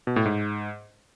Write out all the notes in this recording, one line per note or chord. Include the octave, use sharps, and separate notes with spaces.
B2
A2
G#2